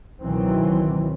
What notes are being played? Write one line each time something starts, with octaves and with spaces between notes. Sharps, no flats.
C#2 B2 D#3 E3 F#3 C4